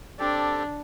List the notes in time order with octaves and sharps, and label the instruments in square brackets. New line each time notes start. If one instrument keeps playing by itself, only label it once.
[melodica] C4 G4 A4 [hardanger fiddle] D4